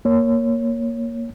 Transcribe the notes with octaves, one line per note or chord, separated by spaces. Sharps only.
A#3 C#5